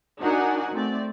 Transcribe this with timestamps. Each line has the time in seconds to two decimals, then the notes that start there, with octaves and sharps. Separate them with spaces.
0.19 D4 D#4 F#4 A#4 F#5 G#5
0.72 A3 C4 D5